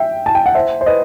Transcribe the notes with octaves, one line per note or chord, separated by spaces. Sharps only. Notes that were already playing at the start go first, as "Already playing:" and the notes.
Already playing: E5 G5
A5
G5
F#5
C5 E5
C5
B4 D#5